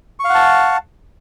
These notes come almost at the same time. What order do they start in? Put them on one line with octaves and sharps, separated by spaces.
C#6 F5 F#5 A5